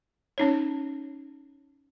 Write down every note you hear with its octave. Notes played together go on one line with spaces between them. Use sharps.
C#4 D#4 C#5